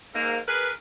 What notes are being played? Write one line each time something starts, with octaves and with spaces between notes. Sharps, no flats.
G#2 A#3
G#4 A#4 B4